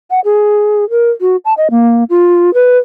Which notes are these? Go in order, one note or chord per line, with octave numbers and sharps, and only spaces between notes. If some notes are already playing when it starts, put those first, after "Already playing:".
F#5
G#4
A#4
F#4
A5
D#5
A#3
F4
B4